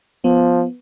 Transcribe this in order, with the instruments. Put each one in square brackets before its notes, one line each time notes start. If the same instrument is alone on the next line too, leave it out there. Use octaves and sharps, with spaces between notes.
[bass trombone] F3 [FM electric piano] B3